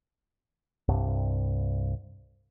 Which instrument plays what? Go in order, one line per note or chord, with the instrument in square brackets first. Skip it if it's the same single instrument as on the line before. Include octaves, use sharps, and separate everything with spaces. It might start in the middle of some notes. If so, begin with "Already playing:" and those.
[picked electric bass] C2 G2